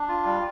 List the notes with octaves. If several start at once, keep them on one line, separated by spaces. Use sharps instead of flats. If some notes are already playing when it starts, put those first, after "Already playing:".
Already playing: D4
F4
G3